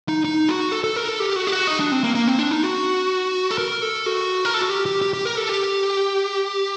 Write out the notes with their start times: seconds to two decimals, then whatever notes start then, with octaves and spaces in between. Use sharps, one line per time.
0.09 D#4
0.25 D#4
0.48 F#4
0.72 A4
0.84 A4
0.96 A#4
1.08 A4
1.20 G4
1.36 F#4
1.47 G4
1.52 F#4
1.67 D#4
1.80 D4
1.92 C4
2.04 A#3
2.15 A#3
2.28 C4
2.39 D4
2.51 D#4
2.63 F#4
3.51 A4
3.58 A#4
3.82 A4
4.06 F#4
4.45 A#4
4.54 A4
4.62 F#4
4.69 G4
4.86 G4
5.02 G4
5.13 G4
5.25 A#4
5.37 A4
5.49 G4